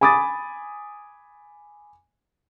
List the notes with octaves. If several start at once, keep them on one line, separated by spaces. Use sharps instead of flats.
G#5 B5 D6 D#6 A6